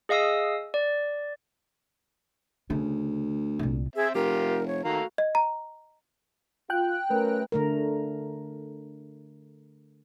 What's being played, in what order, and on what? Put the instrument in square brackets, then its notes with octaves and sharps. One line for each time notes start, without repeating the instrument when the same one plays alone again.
[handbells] G#4 D#5 F5 D#6 E6
D5
[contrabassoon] D2 [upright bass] C#3
[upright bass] C2 A#2
[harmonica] C4 E5 [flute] G#4
[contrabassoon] F1 [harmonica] F4 G4 [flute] A#4
[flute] C#5
[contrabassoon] D#3 [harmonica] A3 F5 A#5 [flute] F#4
[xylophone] D#5
A#5
[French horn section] F4 [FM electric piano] G5 F#6
[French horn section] F#2 C#4 A#4 [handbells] A3 B4
[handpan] D3 A3 A#4